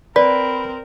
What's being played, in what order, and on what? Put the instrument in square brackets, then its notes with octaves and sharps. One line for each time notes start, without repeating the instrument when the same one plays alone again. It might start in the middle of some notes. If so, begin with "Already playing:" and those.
[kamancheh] C4 A#4 [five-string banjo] B4 [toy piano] D5 [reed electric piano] B5